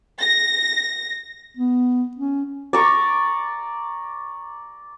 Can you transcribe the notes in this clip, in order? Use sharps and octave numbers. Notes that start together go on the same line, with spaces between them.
A#6
B3
C#4
D5 A#5 C#6